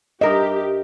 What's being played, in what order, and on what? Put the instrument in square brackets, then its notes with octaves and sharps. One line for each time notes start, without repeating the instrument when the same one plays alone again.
[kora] G2 A#4 E5 [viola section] G4 [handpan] D#5